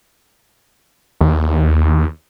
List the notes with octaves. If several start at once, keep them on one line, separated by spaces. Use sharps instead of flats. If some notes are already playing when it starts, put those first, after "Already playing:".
D#2